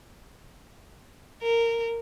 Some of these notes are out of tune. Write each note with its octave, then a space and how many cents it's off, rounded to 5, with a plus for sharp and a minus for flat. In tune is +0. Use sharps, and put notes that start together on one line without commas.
A#4 -15